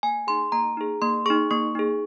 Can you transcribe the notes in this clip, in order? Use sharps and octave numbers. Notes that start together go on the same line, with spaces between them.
A#3 G#5
D#4 G#4 C6
A#3 A#5
D#4 G#4
A#3 C6
D#4 G#4 C#6
A#3 C#6
D#4 G#4